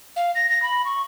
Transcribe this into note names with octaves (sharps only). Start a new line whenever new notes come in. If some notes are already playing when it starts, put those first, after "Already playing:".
F5
A#6
A#6
B5
C#6